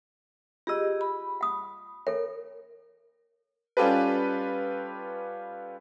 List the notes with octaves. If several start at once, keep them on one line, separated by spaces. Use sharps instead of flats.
F4 G4 G#4 D#5 E6
B5
F#5 D#6
A4 A#4 C#5
G3 C#4 F4 G4 A4 B4